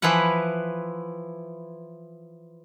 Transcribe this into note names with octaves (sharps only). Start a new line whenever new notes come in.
E3 F3 E4 B4 F#5